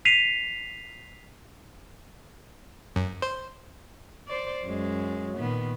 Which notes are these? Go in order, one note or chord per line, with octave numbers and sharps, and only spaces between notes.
B6 C7 D#7 F7
F#2
C5
C5 D5
F#2 G#3
A#2 D#3 B3